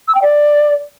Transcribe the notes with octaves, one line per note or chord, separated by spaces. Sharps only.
E6
G5
D5